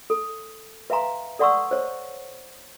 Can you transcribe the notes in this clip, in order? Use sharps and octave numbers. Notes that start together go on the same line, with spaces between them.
A4
B4 E5 F5 G#5 A#5 C6
A4 D5 F#5 C6 C#6 E6
C5 C#5